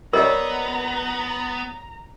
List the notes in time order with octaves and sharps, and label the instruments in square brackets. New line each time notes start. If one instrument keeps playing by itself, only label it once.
[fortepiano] G3 C#5 [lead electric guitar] B3 [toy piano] A#4 D#5 [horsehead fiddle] A#5